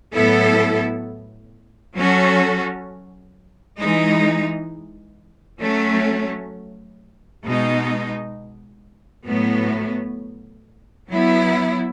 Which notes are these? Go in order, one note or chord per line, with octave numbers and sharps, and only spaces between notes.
A2 F#3 B3 E4 A4
F#3 C#4 F#4 A4
E3 G#3 D#4
F#3 A3 C#4
B2 G#3 D#4
A2 F#3 B3
F#3 B3 E4